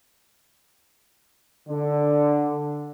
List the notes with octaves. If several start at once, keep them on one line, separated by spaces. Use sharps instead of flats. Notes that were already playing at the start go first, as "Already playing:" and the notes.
D3